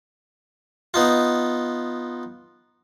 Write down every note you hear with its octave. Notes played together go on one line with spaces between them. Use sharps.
B3 D#4 F4